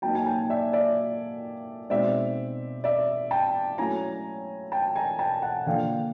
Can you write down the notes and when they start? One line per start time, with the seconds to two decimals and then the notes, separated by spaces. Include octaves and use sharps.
0.02 F#3 A#3 D#4 G5 A5
0.15 G#5
0.26 G5 A5
0.50 D5 E5
0.73 D5 E5
1.90 B2 G#3 C4 D#4 D5 E5
2.84 D5 E5
3.31 G5 A5
3.78 F#3 A3 C#4 E4 G#5 A#5
4.72 G5 A5
4.96 G#5 A#5
5.19 G5 A5
5.42 F#5 G#5
5.66 D3 F3 A#3 D4 F5 G5